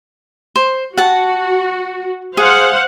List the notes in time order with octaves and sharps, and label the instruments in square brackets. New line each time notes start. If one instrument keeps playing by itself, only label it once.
[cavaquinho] C5
[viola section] F#4 [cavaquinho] F#5 A5
[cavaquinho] G#4 [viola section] C5 F5 F#5